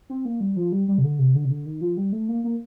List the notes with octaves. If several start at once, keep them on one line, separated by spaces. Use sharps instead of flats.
C4
A#3
G3
F3
G3
G3
C3
D3
C3
D3
C3
D3
D#3
F3
G3
A3
A#3
A#3